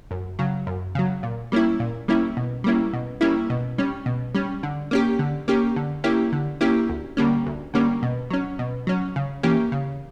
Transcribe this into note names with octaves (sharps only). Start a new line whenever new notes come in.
F#2
C#3 F#3
F#2
C#3 F#3
A#2
G3 A#3 C#4 E4
A#2
G3 A#3 C#4 E4
B2
G3 A#3 C#4 E4
B2
G3 A#3 C#4 E4
B2
G3 C#4
B2
G3 C#4
D3
A#3 C#4 G4
D3
A#3 C#4 G4
D3
A#3 C#4 E4 G4
D3
A#3 C#4 E4 G4
D2
D3 G3 A#3 C#4
D2
D3 G3 A#3 C#4
B2
F#3 C#4
B2
F#3 C#4
C#3
E3 A#3 C#4 G4
C#3